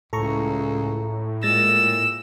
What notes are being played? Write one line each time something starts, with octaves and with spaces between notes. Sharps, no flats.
C#2 A2 A4 A#5 C#6
A#2 G#3 E6 A6 A#6